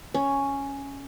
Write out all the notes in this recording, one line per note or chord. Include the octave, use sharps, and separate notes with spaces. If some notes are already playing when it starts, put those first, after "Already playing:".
C#4